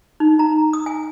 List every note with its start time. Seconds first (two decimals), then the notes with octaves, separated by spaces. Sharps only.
0.20 D#4
0.39 A#5
0.73 D#6
0.86 G#5